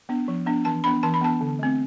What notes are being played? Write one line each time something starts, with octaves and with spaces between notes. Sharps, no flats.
B3 D4
F3
B3 D4
E3 A5
B3 D4 B5
E3 A5
B5
B3 D4 A5
D3
A3 C4